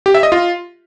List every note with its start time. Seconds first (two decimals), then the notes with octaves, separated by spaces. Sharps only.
0.06 G4
0.14 E5
0.23 D#5
0.32 F4